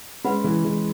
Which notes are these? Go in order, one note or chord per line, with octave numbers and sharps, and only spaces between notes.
G#3 C#4 B4 F#5 B5
E3 G#3
E3 G#3